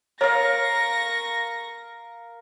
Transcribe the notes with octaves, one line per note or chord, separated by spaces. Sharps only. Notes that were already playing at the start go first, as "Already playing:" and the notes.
A#4 C#5 F5 C#6 A#6